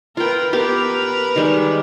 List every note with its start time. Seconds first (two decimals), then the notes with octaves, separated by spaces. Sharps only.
0.17 F4 A#4 B4 G5
0.53 B3 G4 A#4 B4 F5
1.36 D#3 G3 G#3